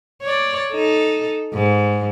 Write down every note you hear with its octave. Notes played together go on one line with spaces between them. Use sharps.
C#5 D5
D#4 A4
G#2